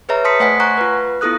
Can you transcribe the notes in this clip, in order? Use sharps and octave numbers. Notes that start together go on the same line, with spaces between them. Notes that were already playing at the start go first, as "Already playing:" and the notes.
G#4 B4 C#5 E5 A#5
A5 C6 D#6 B6 C#7
A3 C5 F#5 G#5 B6
F#5 G#5 A#5 C#6 F#6
F4 B4
B3 E4 F4 A4 D#6 F#6